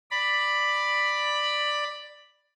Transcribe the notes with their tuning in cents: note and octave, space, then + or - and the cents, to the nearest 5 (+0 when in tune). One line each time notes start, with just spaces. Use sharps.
D5 +10 B5 +0